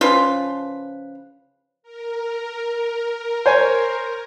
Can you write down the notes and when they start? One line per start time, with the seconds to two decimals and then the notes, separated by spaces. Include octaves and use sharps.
0.01 C#3 F3 F4 B4
1.83 A#4
3.46 C5 C#5 G#5